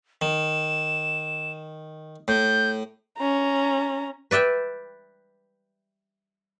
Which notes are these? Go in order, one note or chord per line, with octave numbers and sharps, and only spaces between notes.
D#3 E7
A2 G6
C#4 A#5
B4 D5 E5 G5